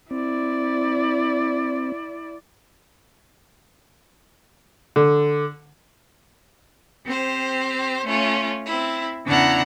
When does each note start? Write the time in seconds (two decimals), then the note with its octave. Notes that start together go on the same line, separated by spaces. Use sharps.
0.11 C4 E4 D5
4.96 D3
7.05 C4 G4 C5
8.05 A3 C#4 F4
8.65 C4 E4
9.25 E2 C#3 D4 E4 F#5 A#5